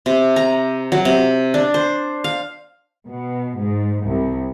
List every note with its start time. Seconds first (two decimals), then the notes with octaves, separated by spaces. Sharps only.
0.06 C3
0.36 A#5
0.92 F#3
1.05 C3
1.54 D4
1.74 C5
2.24 F5
3.05 B2
3.56 G#2
4.04 C2